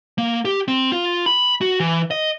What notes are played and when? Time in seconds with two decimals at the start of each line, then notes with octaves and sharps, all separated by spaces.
0.18 A#3
0.45 G4
0.68 C4
0.92 F4
1.26 B5
1.61 F#4
1.80 E3
2.11 D#5